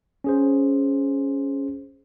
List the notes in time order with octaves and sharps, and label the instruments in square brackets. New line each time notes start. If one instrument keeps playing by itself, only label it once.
[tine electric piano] C#4 G#4 C5